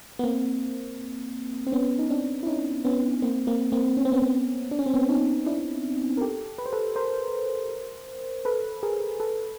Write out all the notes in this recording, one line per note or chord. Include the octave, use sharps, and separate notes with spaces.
B3
A#3 C4
C4
B3 C#4
D#4
C4 D4
E4
C#4 D#4
B3 C#4
A#3 C4
A#3 C4
A#3 C4
C#4
C4
B3 C#4
B3
D4
C#4
C4
B3 C#4
C#4 D#4
D4 E4
A#4
G4 A4
B4
C5
A4 B4
A#4 C5
A4 B4
G#4 A#4
A4 B4